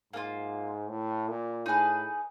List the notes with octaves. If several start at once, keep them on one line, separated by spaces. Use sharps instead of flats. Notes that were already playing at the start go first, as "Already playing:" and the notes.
G#2 A#3 D4 F4
A2
A#2
A2 D#4 G#4 B4